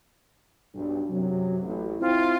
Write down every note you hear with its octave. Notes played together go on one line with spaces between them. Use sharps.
B1 G2
F#2 C3 F#3
A1
C4 E4 F4